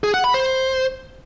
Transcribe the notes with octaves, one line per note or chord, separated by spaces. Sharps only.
G#4
F#5
B5
C5